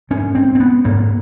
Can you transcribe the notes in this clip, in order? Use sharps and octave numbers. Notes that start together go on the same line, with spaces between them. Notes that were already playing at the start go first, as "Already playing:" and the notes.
G#2 C#4
C4
C4
B3
G#2 A#3